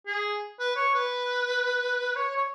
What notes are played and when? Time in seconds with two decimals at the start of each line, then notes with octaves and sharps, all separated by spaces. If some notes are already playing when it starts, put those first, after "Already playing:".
0.07 G#4
0.60 B4
0.76 C#5
0.95 B4
2.16 C#5
2.36 C#5